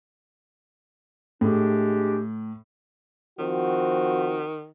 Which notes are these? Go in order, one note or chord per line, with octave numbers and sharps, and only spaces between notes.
A2 G#3 D4 G4
D#3 F3 C4 F#4